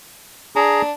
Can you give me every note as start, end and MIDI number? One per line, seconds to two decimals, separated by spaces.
0.56 0.92 62
0.56 0.82 68
0.56 0.82 82